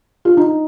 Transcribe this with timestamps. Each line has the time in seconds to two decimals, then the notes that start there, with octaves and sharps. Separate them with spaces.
0.25 F4
0.37 D#4